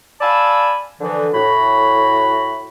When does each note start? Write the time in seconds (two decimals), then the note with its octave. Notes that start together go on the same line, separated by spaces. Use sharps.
0.21 D5 F5 G#5 A5 B5 E6
1.01 D3 E3 F3
1.33 A2 F#4 B5